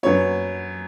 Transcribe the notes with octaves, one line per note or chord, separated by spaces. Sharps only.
F#2 F#3 B3 C#5